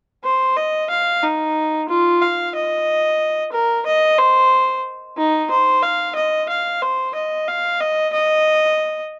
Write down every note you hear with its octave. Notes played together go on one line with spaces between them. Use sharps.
C5
D#5
F5
D#4
F4
F5
D#5
A#4
D#5
C5
D#4
C5
F5
D#5
F5
C5
D#5
F5
D#5
D#5